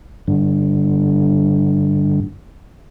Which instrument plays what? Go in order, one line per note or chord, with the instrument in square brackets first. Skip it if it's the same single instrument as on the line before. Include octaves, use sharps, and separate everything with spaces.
[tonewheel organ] G2 D3